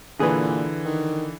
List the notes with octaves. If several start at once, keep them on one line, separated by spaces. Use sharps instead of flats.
A#2 D3 E3 G#4 B4
D#3